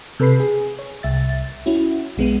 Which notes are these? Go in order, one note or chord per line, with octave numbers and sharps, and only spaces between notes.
C3 A4 B4 B5 C7
G#4
C#5
C2 E5 A6
C#4 E4 F#4
B1 G#3 B3